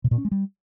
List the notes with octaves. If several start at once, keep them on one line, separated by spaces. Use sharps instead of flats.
B2
A#2
C#4
G#3
G3